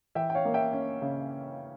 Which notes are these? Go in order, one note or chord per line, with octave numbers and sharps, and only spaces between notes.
E3 E5 G5
G5
C#5 F5
A#3
E5 G5
C#4
C#3